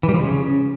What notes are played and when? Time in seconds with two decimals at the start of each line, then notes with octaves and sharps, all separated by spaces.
0.03 E3
0.09 G3
0.14 F3
0.20 C#3